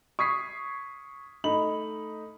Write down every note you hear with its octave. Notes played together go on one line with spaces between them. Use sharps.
C#6 D#6 G#6 B6 C7
A3 D#4 B5 F#7